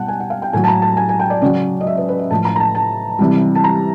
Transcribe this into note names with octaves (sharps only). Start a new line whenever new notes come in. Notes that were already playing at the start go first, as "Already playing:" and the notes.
Already playing: B2 G3 F#5 G5 A5
G#5
F#5
F5
G5
A2 F#3 G#5
A5
A#5
A5
G#5
G#5
G5
D5
C#3 F#3 D5
D#5
E5
B4
B4
E5
A2 F3 A5
A#5
A#5
A5
A5
C3 E3 G3
A5
A#5